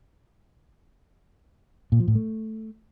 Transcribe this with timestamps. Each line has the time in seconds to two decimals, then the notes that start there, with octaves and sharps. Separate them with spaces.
1.92 A#2
2.00 F3
2.08 A2
2.15 A3